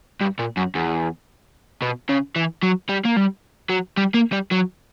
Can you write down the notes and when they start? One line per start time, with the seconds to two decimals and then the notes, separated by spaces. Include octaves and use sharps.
0.21 G2
0.39 A#2
0.57 F#2
0.75 E2
1.82 B2
2.09 C#3
2.36 E3
2.63 F#3
2.89 G3
3.05 A#3
3.16 G3
3.70 F#3
3.97 G3
4.14 A#3
4.32 G3
4.51 F#3